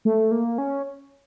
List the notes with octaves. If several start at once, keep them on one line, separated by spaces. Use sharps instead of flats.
A3
A#3
C#4